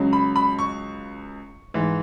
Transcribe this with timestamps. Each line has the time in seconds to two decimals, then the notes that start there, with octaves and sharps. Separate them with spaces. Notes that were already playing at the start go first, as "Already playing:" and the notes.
Already playing: C#2 C#3 F#3
0.13 B5
0.36 B5
0.59 C#6
1.74 G#2 E3